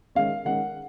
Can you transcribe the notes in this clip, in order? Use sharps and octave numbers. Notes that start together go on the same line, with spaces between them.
D#3 G#3 C#4 F5
D#3 G#3 C#4 F#5